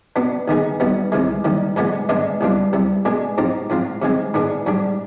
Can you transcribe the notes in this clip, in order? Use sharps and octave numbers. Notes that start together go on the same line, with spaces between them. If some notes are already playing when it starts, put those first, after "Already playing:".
B2 B3 D4
D#2 D#3 B3 D#4 G#4
B1 B2 G3 B3
C2 C3 D#3 G#3
D#2 D#3 G3
G2 D3 F3 G#3 B3
G#2 D#3 G#3 B3 D4
C2 B2 G3 D4 F4
C2 C3 G3
B2 G#3 D4 G#4
G#2 F3 C4 D#4 G4
G#2 F3 C4 F4
C3 D#3 G#3 C4
G#2 D#3 B3 D4 G#4
G#2 G3 D4 G4